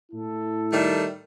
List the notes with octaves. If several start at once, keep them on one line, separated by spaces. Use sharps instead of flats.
A2 E4 A4
D#3 G3 A3